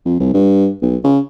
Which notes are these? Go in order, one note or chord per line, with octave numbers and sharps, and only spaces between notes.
F2
C2
G2
B1
C#3